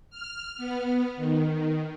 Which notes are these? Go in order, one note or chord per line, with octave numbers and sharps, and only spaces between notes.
F6
B3
D#3